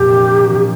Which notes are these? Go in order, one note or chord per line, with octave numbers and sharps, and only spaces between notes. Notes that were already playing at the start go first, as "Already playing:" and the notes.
Already playing: F2 A#2 F3 G4
D4
A#3
F3
A#2